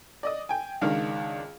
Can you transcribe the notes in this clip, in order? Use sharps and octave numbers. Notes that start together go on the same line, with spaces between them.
D5 D#5 D#6
G5 G#5
C#2 D#3 D4 F5 F6